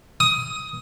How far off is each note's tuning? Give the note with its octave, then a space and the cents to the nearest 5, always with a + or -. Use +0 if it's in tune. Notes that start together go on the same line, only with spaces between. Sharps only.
D#6 +15